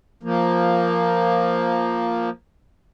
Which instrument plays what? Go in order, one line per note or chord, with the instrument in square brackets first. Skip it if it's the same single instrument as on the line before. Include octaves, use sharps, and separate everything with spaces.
[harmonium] F3 A#3